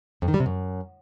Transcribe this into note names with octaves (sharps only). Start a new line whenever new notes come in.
F2
D#3
G3
C3
F#2